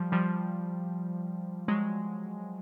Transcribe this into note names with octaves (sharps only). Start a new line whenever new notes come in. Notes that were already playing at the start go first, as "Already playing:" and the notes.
Already playing: F3 G3
F3 G3
F#3 G#3